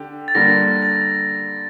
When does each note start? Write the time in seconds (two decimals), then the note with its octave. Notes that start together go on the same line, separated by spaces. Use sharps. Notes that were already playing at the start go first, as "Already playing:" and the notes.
Already playing: D3 G4
0.28 A6
0.35 D3 G3 A#3 A#6
0.82 A6